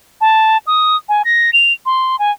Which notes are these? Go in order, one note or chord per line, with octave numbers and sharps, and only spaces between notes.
A5
D#6
G#5
A#6
F7
C6
G#5